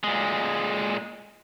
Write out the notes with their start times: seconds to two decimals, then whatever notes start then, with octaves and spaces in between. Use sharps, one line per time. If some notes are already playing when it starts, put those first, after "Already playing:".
0.04 A#2 G#3